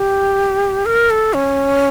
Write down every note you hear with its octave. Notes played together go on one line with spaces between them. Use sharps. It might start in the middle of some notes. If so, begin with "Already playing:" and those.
Already playing: G4
A#4
A4
C#4